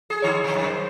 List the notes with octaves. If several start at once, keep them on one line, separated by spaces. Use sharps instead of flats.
G#4
D#3 D#4 C#5
G#2 C3
F#2 D#3
C5